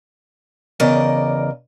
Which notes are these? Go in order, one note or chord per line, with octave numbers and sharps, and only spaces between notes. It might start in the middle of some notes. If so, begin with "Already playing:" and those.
E2 C#3 A#4 D5 D#5